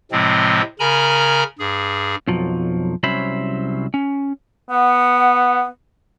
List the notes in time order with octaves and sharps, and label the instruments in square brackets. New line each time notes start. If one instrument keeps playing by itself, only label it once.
[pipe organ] A2 C3 F3 G#3 C4
C#3 A#4 G#5 A#5 B5
G2 G#4
[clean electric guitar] B1 F2 F3 F#3
C2 F#3 C#4 C5 E5 B5
C#4
[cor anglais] B3 [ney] F#5